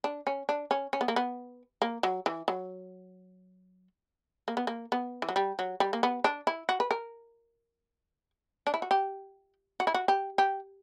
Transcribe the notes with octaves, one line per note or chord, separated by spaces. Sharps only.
D4
C#4
D4
C#4
C#4
B3
A#3
B3
A#3
F#3
E3
F#3
A#3
B3
A#3
B3
E3
F#3
G3
F#3
G3
A#3
B3
D4
E4
F#4
B4
A#4
D4
E4
F#4
G4
F#4
E4
F#4
G4
G4